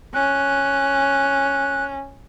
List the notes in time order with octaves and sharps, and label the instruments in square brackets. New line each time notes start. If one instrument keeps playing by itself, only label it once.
[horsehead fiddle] C#4 [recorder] F#6